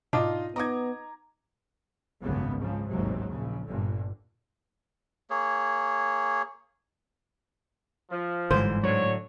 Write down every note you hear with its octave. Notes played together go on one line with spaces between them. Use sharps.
G#2 B2 D4 D#4 F4 D#5
B3 D#4 D#5 A#5 D6 G#6
G#1 C#2 F#2 A2 C#3 B3
G#2 C#3 F3
A1 D#2 G#2 C3 F#3
A#1 C#3
G1 G2 A#2 D3
A#3 G#4 C#5
F3
G1 G#2 D3 E3 C5
A2 D3 F#3 C#5